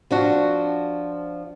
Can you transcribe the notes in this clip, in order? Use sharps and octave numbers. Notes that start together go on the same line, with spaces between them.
F3 D4 F#4